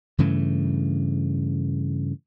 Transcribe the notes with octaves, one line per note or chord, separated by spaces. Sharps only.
G2 C#3 E3 A3